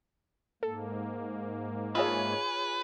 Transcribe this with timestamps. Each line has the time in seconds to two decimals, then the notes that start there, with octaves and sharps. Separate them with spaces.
0.63 G#2 A#3 A4
1.95 F4 G#4 B4 C#5 D#5 E5 A5